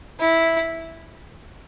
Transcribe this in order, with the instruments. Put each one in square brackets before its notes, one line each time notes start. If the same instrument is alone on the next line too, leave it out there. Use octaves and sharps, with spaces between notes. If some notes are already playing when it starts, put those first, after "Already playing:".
[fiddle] E4